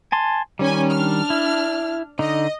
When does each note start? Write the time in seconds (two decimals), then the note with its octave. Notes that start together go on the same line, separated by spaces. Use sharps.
0.12 G#5 A5 C6
0.59 D#3 G3 C#4 G#5
0.90 D4 F6
1.30 E4
2.19 D3 D#4 D#5